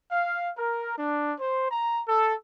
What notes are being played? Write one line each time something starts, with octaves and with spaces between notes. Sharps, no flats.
F5
A#4
D4
C5
A#5
A4